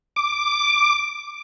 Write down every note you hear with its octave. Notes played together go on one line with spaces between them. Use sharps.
D6